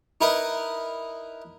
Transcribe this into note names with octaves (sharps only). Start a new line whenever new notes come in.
D#4 E4 A#4 B4 D#5